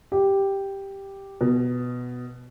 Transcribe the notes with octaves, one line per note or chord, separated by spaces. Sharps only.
G4
B2